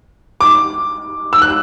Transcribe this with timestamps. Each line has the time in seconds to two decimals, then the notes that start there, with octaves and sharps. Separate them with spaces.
0.41 D6
1.33 E6
1.42 F#6